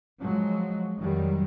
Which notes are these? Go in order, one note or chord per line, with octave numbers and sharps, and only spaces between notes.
F3 F#3 G#3
F2 D#3 F#3 G3